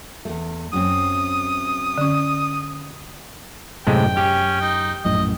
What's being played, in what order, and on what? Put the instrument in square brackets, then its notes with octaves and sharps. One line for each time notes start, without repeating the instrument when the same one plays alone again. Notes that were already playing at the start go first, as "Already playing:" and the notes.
[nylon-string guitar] E2 A3
[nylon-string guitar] F#2 C4 [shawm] D#6
[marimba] D3 C#4
[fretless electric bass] F#2 [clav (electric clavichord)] A2 C3 G#3 [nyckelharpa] G5
[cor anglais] C#4 [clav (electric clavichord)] G4
[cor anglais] D#4
[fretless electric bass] A#1 F#2 A2 [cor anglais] D#5